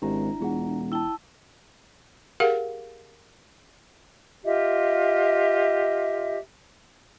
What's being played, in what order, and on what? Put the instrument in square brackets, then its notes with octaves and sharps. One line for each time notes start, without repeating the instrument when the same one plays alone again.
[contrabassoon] G#1 [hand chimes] D4 E4 A#5 [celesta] G4
[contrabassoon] E1 [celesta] F4 G#4 F#5
[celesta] E4 G5 G7 [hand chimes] A5 E6
[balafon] G4 G#4 A#4 F5 F#5
[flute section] F4 G4 D#5 E5